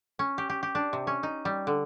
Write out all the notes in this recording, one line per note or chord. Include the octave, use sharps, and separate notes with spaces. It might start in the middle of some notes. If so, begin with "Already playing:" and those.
C#4
G4
G4
G4
D4
C3
C#4
D#4
G3
D3